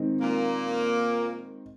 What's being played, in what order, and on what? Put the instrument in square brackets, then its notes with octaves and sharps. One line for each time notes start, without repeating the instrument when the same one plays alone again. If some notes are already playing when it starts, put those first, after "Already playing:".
Already playing: [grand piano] D#3 G#3 C4 D#4
[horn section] A#2 A#3